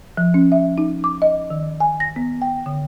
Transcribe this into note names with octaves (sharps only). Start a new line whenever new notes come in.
F3
C#4
E5
D#4
D6
D#5
D#3
G#5
A#6
B3
G5
D3